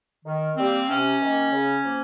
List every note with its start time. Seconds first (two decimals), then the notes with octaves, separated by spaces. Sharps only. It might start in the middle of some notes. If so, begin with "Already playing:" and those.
0.24 D#3
0.56 G3 A#3 C4
0.88 C3 C#4
1.21 D#3 A#3
1.51 C#3
1.83 F3 A#3